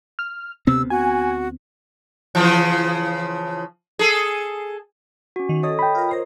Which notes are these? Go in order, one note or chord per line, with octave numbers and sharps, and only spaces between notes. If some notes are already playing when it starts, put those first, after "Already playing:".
F6
D2 C3 B3 C4 E6
F#4 G#5
C#3 E3 F3
G#4 A4
C#4 F#4
D#3
A4 C#5 D#5 D#6
G5 B5
F4 A#4
A#4 C5 A#5